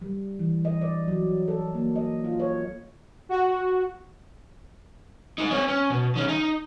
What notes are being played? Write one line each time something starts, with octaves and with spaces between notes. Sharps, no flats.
G3
E3
D#5
D5
F#3
A4
A#3
D#5
F4
C#5
F#4
G#3 D#4
C4 C#5
C#4
B2
D#3 C#4
D#4